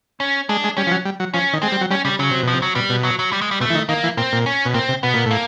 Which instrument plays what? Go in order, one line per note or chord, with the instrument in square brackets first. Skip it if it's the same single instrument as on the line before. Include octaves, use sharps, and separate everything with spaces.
[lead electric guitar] C#4
[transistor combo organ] G#3 [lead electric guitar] D4
[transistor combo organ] G#3
[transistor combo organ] G3 [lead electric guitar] C#4
[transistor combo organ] F3
F#3
G3
F#3
[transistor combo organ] F3 [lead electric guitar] C#4
[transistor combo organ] D#3
[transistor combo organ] G#3 [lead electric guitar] C4
[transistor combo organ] G3
F#3
[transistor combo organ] G3 [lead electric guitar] C#4
[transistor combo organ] C#3 [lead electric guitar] G3
[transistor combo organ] C#3 [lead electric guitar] F#3
[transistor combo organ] C3
[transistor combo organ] B2 [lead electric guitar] F3
[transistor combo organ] C3
[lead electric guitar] F#3
[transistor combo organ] B2 [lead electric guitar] G3
[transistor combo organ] B2
[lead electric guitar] F#3
F#3
G3
G#3
G3
[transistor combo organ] B2 [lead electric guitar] A3
[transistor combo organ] E3
D#3
[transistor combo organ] D#3 [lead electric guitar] A#3
[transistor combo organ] E3
[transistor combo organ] A#2 [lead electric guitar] C4
[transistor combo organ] A#2
[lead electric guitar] C#4
[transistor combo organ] B2
[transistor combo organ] A#2 [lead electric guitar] C4
[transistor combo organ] C3
[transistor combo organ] B2 [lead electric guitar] B3
[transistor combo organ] A#2
A2
[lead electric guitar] A#3